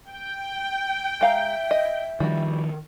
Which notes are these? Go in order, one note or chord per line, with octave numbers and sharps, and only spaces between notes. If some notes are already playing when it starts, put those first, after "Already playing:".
G5
G#3 E5 F5 A#5
D#5
D#3 F3 G3 F#4